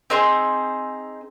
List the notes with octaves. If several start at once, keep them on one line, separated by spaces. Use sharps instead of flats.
C4 D#4 G#4 C5